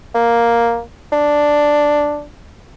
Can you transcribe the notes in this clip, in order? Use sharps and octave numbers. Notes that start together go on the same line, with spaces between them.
A#3
D4